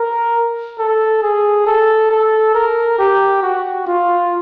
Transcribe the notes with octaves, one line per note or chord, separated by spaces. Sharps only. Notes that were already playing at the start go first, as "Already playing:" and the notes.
Already playing: A#4
A4
G#4
A4
A4
A#4
G4
F#4
F4